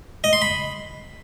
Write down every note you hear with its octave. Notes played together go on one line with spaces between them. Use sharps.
D#5
C6
B5